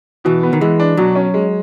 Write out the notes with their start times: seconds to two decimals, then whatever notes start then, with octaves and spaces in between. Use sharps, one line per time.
0.25 B2 E3
0.43 B3
0.53 D#3
0.61 E3 G#3
0.80 D4
0.97 B2 F#3
1.15 C#4
1.34 G#3